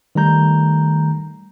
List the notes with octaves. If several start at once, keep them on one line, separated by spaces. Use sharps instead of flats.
D#3 G3 A3 A#5 G6